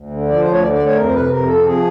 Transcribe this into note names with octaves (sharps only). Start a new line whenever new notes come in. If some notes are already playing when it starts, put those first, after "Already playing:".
Already playing: D2
D3
F3 D5
C5
D2
C#5
D3 D5
D5
D2
C#5
F2 A#4
C5
C3 B4
F2 A#4
C3 A4
F3 G#4